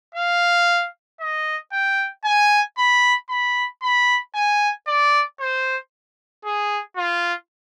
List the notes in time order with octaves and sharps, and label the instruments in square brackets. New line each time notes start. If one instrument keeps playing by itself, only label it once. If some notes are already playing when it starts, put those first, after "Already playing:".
[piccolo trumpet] F5
D#5
G5
G#5
B5
B5
B5
G#5
D5
C5
G#4
F4